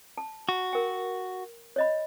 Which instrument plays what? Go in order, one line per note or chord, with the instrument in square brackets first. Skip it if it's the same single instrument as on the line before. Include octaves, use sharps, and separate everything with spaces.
[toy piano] A5
[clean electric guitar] F#4
[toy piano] A#4 G5
C#5 D#5 B5